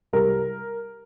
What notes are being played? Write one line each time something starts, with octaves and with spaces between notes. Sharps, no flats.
C2 C3 G3 A#4